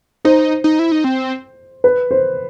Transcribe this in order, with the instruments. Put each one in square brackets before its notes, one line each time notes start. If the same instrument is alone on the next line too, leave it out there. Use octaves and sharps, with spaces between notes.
[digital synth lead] D#4 [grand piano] C5
[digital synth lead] D#4
E4
D#4
C4
[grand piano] B4
C5